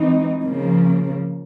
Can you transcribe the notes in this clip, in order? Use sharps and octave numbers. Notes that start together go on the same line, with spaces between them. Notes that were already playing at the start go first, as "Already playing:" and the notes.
Already playing: E3 G#3 C4 D#4
C#3 F3 A#3